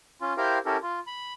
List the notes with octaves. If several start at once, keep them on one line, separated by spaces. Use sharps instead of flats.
C#4 F4
E4 G4 A#4 C5 F5 G5
C#4 E4 G4 A4 A#4
F4
B5